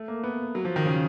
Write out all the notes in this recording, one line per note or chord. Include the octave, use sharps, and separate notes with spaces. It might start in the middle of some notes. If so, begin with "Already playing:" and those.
Already playing: A3
A#3
B3
F#3
F3
D#3
C#3